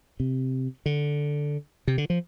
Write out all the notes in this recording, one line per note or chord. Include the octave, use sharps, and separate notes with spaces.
C3
D3
C3
D3
F3